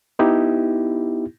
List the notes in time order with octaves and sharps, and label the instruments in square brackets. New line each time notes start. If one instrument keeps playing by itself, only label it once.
[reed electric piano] B3 D#4 E4 G4